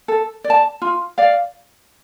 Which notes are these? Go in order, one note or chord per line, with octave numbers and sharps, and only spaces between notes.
A4
D5
A5
F4
D5 F5